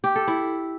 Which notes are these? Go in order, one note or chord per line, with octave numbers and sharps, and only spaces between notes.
G4
A4
E4